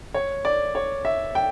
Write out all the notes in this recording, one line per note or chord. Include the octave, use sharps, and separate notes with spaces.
C#5
D5
C#5
E5
G5